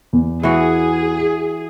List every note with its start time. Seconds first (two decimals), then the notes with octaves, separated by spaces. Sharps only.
0.13 E2
0.43 E3 F#4 G#4